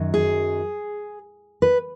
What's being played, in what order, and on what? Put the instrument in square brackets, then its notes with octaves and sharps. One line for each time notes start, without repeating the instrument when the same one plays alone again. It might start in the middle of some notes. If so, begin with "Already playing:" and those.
Already playing: [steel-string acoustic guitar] F#2 D#3 F#3
G#4
B4